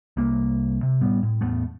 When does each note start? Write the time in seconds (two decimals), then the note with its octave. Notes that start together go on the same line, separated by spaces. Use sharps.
0.17 C2 A#3
0.83 C3
1.01 A2 G3 B3
1.23 A2
1.41 E2 A2 A3 B3